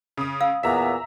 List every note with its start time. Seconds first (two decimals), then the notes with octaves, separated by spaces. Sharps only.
0.17 C#3 D#6
0.41 F5 E6
0.63 E2 A#2 B3 E5 A#5